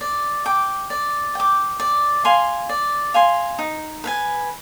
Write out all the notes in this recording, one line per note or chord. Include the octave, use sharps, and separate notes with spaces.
D5
G5 D6
D5
G5 D6
D5
F5 G#5 C6
D5
F5 G#5 C6
D#4
B4 F5 G#5